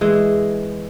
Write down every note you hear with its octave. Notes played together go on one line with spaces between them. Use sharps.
E3 G#3